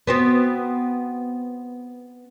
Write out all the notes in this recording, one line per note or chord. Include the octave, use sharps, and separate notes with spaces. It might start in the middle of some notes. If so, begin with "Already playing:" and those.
B3 C4 F#4